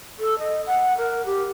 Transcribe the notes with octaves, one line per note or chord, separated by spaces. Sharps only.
A4
D#5
F#5
A#4
G4